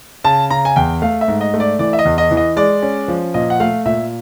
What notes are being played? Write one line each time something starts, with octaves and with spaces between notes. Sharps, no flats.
C#3 A5
C#3 A#5
G#5
E2 G5
A3 F5
E5
G#2
D#5
A3
D5
E3 D5
E5
D#5
E2
D#5
E3
D#5
G#3 D5
C#4
F3
A#2 D#5
F#5
A3 F5
A#2 E5